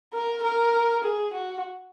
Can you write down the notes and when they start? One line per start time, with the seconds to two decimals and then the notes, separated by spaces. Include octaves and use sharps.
0.13 A#4
0.43 A#4
1.04 G#4
1.33 F#4